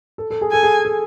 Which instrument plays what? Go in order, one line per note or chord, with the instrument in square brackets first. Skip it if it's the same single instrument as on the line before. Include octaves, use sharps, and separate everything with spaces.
[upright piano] A4
A4
G#4
[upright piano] A4 [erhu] G#5
[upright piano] G#4
A4